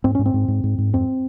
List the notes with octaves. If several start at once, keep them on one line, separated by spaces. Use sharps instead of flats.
G#2 C4
G#2 C#4
C4
G#2
G#2
G#2
G#2
F2 C4